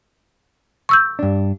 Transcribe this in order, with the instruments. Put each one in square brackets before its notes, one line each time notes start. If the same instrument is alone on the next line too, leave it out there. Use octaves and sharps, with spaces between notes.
[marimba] C#6 E6 G6
[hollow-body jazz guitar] G2 D4